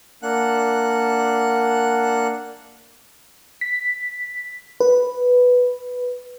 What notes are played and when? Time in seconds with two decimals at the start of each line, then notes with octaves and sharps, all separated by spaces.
0.23 A#3 D4 F#5 F#6
3.61 B6
4.80 B4